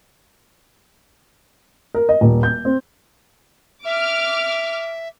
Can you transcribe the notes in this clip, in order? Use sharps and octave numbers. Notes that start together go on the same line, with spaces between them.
A#4
D#5
D#1
G6
C4
E5 D6 F6